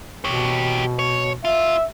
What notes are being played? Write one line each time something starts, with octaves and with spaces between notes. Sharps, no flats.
B2 G4 C#5
C#5
F4 E5